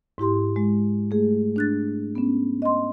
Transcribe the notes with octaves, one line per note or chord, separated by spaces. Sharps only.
G#2 E4 G4 C6
G#3
A3 G#4
D4 F#6 A6
B3 C#4
D#5 C6